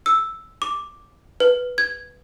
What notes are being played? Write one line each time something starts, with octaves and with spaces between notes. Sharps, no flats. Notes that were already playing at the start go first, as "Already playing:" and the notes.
E6
D6
B4
G#6